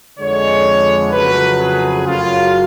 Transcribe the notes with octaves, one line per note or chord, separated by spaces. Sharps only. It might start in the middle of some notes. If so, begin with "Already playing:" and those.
F2 D3 G#3 C#5
F2 C#3 F#3 A3 B4
G#4
F#2 C#3 F#3 F4